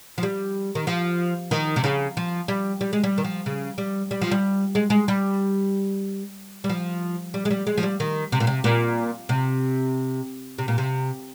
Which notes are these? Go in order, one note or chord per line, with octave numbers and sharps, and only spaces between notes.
F3
G3
D#3
F3
D#3
C3
C#3
F3
G3
G3
G#3
G3
D#3
F3
C#3
G3
G3
F3
G3
G#3
G#3
G3
G3
F3
G3
G#3
G3
G#3
F3
G3
D#3
C3
A#2
C3
A#2
C3
C3
A#2
C3